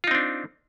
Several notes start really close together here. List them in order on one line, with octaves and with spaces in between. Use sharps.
F4 D#4 C4 D4